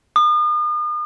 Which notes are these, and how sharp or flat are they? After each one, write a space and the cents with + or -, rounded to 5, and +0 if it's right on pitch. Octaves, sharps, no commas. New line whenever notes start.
D#6 -40